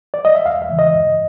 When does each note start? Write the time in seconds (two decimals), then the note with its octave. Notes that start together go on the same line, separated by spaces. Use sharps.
0.14 D5
0.25 D#5
0.35 E5
0.45 E2 F5
0.62 E5
0.70 C#3 E3
0.79 D#5
0.94 G2